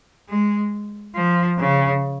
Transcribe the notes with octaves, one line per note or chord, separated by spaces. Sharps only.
G#3
F3
C#3